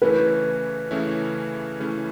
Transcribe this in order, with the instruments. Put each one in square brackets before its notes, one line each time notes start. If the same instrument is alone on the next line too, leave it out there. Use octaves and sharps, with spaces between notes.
[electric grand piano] C#3 E3 A3 C#4 E4 [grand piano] B4
[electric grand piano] C#3 E3 A3 C#4 E4
C#3 E3 A3 C#4 E4